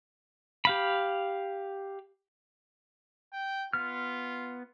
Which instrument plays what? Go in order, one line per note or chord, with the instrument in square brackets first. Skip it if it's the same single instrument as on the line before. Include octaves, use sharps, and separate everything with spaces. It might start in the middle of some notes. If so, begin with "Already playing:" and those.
[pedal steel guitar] G4 F5 B5
[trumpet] G5
[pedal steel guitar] B3 F6 [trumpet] F4